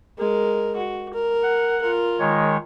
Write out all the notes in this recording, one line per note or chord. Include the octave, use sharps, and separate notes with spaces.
G#3 A#4
F#4
A#4
F#5
F4 A#4
D#3 G#3 C#5